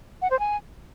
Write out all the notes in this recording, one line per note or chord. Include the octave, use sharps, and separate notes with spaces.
F#5
C5
G#5